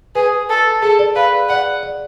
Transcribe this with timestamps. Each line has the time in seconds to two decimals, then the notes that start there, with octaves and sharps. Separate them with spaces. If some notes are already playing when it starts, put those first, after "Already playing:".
0.15 G#4 B4
0.49 A4
0.82 G#4 A4
0.99 D5
1.15 B4 F5
1.49 D5 F#5
1.83 D5